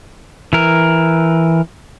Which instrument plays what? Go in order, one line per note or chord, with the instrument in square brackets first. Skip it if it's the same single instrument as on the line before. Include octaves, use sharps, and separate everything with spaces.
[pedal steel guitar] E3 A#4